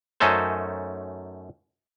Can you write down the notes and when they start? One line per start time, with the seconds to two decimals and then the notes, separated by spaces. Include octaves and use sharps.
0.20 F#2 A3 C#4 D#4 A4 C5